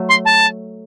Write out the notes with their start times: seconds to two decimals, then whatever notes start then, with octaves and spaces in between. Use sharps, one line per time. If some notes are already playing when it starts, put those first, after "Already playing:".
Already playing: F#3 A3
0.09 C6
0.25 A5